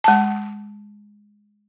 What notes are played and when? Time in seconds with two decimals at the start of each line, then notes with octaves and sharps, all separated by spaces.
0.04 G#3 A5